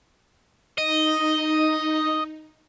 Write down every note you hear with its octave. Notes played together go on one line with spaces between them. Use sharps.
D#4 D#5